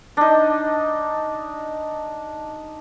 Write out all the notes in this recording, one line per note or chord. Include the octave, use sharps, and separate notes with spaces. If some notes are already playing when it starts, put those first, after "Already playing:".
D4 D#4